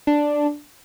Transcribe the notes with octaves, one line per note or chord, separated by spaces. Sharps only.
D4